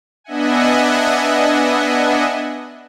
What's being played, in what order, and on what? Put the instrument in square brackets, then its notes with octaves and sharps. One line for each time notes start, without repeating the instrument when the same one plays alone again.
[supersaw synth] B3 D4 D#5 E5 F#5 G#5